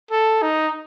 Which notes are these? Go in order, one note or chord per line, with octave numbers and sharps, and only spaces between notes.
A4
D#4